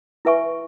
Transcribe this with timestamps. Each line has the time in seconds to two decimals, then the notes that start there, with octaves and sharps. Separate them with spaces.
0.25 E4 B4 E5 G#5 C#6